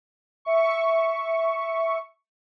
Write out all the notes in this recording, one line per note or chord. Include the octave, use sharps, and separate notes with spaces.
E5 C#6